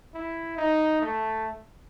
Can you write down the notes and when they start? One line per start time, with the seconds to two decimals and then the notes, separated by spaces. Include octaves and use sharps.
0.14 E4
0.57 D#4
1.01 A3